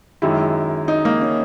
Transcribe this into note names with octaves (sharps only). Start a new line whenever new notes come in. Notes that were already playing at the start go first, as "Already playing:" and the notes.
F#2 D#3 G#3 E4
D#4
A#3
C#4